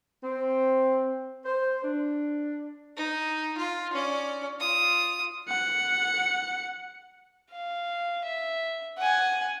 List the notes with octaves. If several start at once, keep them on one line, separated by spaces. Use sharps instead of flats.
C4
C5
D4
D#4
F4
C#4 D5
F4 D#6
F#5 C#7
F5
E5
F#5 G#5